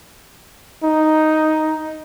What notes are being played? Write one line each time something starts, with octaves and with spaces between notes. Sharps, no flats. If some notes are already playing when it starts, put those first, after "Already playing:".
D#4